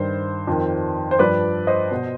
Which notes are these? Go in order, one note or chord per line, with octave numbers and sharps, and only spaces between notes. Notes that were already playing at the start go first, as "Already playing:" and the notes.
Already playing: G2 D#3 C5
F2 D#3
C5
G2 F3 B4 D5
C5 D#5
B2